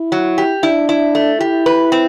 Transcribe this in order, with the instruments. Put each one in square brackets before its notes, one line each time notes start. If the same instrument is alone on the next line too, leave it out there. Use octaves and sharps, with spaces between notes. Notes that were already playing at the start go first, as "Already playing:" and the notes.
Already playing: [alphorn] E4
[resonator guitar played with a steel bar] F#3
G4
[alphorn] D4 [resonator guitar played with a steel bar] E4
[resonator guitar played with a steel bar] E4
A3
[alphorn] E4 [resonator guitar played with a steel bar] G4
[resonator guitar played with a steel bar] B4
C4